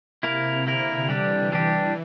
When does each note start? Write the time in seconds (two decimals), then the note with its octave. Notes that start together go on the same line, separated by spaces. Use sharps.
0.23 C3 A#3 E4 A#4
0.67 D3 A#3 E4 A#4
1.09 E3 G3 D4 G4
1.52 G3 D4 G4